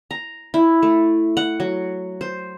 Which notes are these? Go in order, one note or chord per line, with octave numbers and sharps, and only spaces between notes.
A#5
E4
A3
F#5
F#3
C5